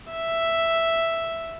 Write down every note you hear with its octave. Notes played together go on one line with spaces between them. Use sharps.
E5